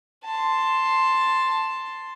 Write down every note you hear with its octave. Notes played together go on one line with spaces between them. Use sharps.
A5 C6